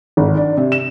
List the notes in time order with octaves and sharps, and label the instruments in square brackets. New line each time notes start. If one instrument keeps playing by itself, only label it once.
[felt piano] G#1
D4
C3
E7